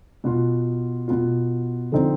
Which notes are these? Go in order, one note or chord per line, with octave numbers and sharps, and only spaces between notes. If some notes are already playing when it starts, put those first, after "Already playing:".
B2 B3 F4
B2 B3 F4
D3 F3 C4 D#4